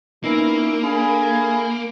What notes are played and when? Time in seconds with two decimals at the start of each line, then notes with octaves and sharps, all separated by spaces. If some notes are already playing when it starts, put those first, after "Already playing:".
0.24 A#2 A#3 B3 C#4 D#4 E4
0.83 A3 D4 G#4 F5 G#5 B5